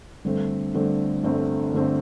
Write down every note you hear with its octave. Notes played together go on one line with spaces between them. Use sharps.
G1 G2 D3 A3 C4
G1 G2 D3 A3 C4
G1 G2 D3 A3 C4
G1 G2 D3 A3 C4